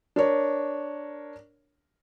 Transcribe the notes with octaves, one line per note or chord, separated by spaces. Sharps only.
D4 A#4 C#5